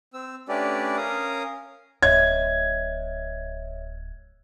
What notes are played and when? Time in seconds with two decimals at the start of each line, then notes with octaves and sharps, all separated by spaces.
0.14 C4 E6
0.49 A3 C#4 D4 G4 B4 D5
0.97 C#4 A#4 F5 D#6
2.03 D1 C#5 D#5 E5 G#6